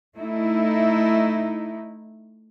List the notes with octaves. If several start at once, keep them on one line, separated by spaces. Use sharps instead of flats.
A3 D#4 E4